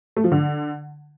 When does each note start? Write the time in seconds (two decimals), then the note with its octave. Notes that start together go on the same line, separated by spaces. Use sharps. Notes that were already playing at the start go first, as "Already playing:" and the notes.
0.17 A3
0.24 F3
0.32 D3